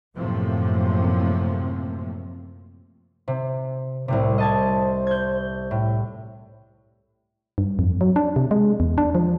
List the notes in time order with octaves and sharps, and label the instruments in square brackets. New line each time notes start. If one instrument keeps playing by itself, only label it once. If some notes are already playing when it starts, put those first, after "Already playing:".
[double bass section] F#2 A2 C3 F3 A3 A#3
[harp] C3
[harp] C2 A2 C3 [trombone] C5
[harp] D#5 A5 G#6
G6 G#6
A2
[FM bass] G2
F2
F#3
D4
C3
G#3
E2
D4
F3